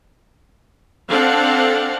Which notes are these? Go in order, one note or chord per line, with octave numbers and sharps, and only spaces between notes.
C4 D4 A4 F5 F#5